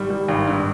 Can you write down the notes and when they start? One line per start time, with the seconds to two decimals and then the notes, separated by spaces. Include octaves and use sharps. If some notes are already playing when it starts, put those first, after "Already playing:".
Already playing: G#1 G3
0.10 G3
0.28 G#1
0.47 G2